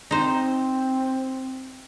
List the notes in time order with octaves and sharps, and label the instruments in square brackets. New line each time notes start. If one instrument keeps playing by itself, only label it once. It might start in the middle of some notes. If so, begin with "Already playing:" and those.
[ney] C4 [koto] D#4 C5